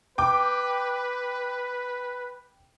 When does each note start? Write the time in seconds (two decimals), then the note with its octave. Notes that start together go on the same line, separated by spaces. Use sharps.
0.18 B4 G5 D6